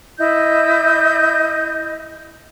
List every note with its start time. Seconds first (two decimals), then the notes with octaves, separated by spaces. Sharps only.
0.18 E4 D#5 G6